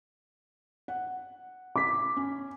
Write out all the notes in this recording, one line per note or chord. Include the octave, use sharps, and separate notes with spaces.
F#5
D6 B6
C#4